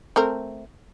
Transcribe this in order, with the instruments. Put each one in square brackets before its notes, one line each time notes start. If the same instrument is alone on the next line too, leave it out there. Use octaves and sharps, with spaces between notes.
[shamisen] A3 C4 A#4